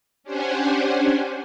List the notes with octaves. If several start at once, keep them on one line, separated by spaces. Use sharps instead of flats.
C#4 D4 G4 C5 F#5 G#5